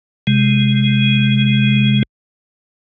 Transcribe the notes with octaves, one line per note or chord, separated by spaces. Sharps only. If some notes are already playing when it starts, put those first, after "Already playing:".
C3 G#3